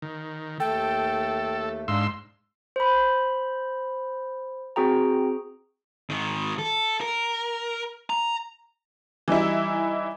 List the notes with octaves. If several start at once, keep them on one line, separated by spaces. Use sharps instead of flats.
D#3
D#2 A3 A4 G5
G#2 D4 F5 C6 E6
C5 B5
C4 F#4 G#4 G5 A#5
G#2 D#3
A4
A#4
A#5
E3 G3 D#4 E4